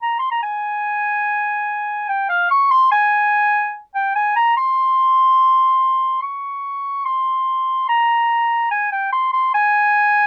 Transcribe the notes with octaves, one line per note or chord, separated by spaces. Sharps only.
A#5
C6
A#5
G#5
G5
F5
C#6
C6
G#5
G5
G#5
A#5
C6
C#6
C6
A#5
G#5
G5
C6
C6
G#5